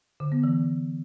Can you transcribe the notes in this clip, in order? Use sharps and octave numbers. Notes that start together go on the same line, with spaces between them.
D3
B3
E3